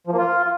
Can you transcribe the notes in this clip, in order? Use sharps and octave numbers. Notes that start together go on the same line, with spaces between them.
F3
A#3
F4